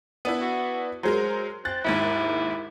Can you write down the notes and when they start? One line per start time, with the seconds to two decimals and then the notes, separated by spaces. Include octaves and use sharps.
0.25 B3 D4 E4
0.41 F#4
1.03 F#3 G#3 A#4 C5
1.65 C4 F#6 A6
1.84 G#1 D#2 G#2 E4